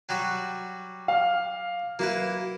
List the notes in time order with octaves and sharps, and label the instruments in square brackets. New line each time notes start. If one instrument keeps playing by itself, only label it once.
[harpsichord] F#3 G3 F#4
[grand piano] F5 F6
[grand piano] F#3 [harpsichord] A#3 E4 B4